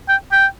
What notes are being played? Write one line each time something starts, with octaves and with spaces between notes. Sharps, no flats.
G5
G5